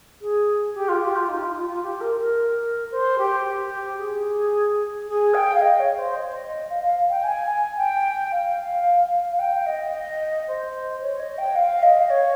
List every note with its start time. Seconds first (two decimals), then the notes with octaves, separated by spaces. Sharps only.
0.21 G#4
0.74 G4
0.88 F4
1.01 G4
1.15 F4
1.28 D#4
1.42 F4
1.56 F4
1.69 F4
1.82 G4
2.00 A#4
2.19 A#4
2.91 C5
3.18 G4
3.45 G4
3.98 G#4
5.07 G#4
5.34 G5
5.54 F5
5.61 D#5
5.79 C#5
5.97 C5
6.15 D#5
6.69 F5
6.83 F5
7.09 G5
7.23 G#5
7.77 G5
8.31 F5
9.31 F5
9.39 G5
9.66 D#5
9.94 D#5
10.47 C5
11.01 C#5
11.19 D#5
11.38 G5
11.55 F5
11.82 D#5
12.09 C#5